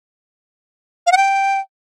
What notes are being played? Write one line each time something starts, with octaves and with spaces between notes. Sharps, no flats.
F5
F#5
G5